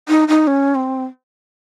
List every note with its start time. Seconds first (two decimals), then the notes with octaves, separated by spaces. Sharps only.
0.08 D#4
0.28 D#4
0.47 C#4
0.75 C4